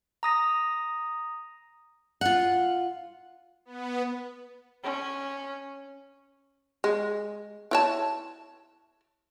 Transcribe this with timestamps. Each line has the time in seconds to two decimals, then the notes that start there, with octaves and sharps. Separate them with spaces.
0.23 A#5 D#6 A#6
2.21 F4 F#5
3.65 B3
4.83 C#4
6.84 G#3
7.71 E4 C#5 A5